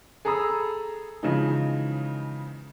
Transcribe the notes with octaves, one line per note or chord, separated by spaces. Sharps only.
G#4 A4 A#5 B5 D#6 E6
C#3 E3 F3 G#3 D#4